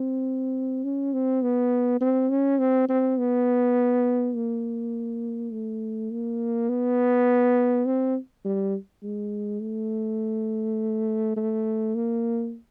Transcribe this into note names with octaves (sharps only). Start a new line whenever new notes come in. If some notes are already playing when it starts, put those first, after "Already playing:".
Already playing: C4
C#4
C4
B3
C4
C#4
C4
C4
B3
A#3
A3
A#3
B3
C4
G3
G#3
A3
A3
A#3